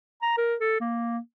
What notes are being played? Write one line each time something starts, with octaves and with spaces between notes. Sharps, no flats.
A#5
A#4
A4
A#3